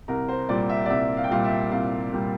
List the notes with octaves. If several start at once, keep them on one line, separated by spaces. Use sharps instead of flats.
C2 A#4
C5
A#2 G3 D5
E5
D5
C2 E5
F5
G5
A#2 G3 F5
E5
C2 F5
A#2 G3